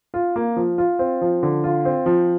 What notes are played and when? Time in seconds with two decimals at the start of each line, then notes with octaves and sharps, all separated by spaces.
0.14 F4
0.36 A#3
0.56 F3
0.78 F4
0.99 C4
1.21 F3
1.43 D3
1.64 F4
1.85 C4
2.06 F3